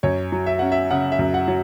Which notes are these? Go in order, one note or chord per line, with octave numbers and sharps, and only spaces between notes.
F#2 C#5
F#3
E5
C#4 F#5
E5
C#3 F#5
E5
F#2
F#5
F#3